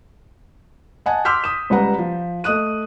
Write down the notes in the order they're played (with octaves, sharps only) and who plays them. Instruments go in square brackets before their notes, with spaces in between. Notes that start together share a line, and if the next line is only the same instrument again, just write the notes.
[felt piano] D#5 F#5 G#5 A5
C6 D6 E6 F6 G6 B6
D#6 E7
C#2 G3 B4 F#5 A#5
F3
A3 D#5 D#6 F#6 D#7